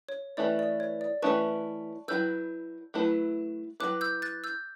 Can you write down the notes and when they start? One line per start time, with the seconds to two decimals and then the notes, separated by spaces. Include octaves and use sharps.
0.09 C#5
0.37 E3 A3 C#4 E4 B4 D5
0.59 D5
0.80 C#5
1.01 D5
1.22 E3 A3 C#4 E4 B4 A5 C#6
2.08 F#3 A3 E4 B4 E6 G6
2.94 F#3 A3 E4 B4
3.80 F#3 A3 E4 B4 D6 F#6
4.01 E6 G6
4.22 F#6 A6
4.44 E6 G6